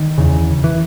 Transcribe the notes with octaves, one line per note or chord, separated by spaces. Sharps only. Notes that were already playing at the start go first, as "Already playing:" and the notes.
Already playing: D#3
E2 C#3
E3